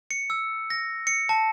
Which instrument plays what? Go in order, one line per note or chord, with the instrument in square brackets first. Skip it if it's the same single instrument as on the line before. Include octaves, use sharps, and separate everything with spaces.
[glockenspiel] C#7
E6
A#6
C#7
A5